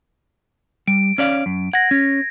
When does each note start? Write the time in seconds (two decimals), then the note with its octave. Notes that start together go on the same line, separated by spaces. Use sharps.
0.88 G3 D7
1.18 C#4 D5 F5
1.46 F#2
1.73 F#5 G#6 A#6
1.91 C#4